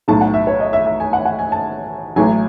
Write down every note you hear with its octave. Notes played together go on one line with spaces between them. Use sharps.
B1 A2 F#3 A5
F#5
E5
C#5
D#5
E5
E5
G#5
F#5
F#5
G#5
A5
A1 A2 F#3 G#5